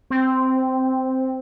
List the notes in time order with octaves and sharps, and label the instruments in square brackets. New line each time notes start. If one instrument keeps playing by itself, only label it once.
[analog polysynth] C4